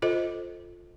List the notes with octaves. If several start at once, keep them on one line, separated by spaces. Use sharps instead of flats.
F4 A4 C5 D#5